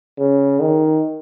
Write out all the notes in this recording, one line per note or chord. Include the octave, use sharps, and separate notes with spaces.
C#3
D#3